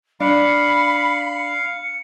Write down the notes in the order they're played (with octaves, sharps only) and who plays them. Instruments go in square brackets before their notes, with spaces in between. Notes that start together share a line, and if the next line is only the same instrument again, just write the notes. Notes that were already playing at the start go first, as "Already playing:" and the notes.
[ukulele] D4 [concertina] F5 [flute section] B5 [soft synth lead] C#7